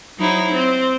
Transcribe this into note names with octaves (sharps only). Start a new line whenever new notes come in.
F#3 D#4 E4 C5
C4